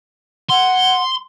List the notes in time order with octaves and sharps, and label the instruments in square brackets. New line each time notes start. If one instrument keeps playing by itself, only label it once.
[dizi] F#5 [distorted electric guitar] C6